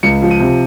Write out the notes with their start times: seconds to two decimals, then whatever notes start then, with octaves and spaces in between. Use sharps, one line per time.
0.03 C#2 C#7
0.22 F3
0.31 D#7
0.40 C3